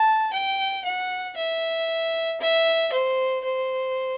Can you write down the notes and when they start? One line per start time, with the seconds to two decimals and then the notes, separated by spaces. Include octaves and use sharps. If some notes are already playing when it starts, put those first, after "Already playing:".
Already playing: A5
0.33 G5
0.85 F#5
1.37 E5
2.41 E5
2.93 C5
3.44 C5